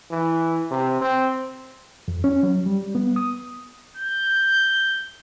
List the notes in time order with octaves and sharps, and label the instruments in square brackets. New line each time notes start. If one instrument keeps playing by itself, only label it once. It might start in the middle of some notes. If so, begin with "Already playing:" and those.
[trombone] E3
C3
C4
[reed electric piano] F2
C#4
F#3
G3
B3
D#6
[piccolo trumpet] G6